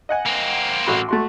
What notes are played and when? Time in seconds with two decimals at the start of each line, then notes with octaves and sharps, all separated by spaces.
0.09 D#5 F#5 G#5
0.26 A#3 C4
0.87 A1 F#4 B5
1.09 A3 F#4 C6